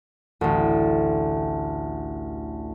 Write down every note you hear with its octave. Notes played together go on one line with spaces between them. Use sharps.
A1 D2